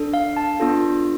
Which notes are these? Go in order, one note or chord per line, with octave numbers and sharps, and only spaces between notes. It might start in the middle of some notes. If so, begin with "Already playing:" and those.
Already playing: D4 A4
F5
A5
B3 D4 F4 A4